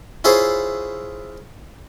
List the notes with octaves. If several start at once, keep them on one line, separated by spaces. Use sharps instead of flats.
E4 F4 G#4 C5 C#5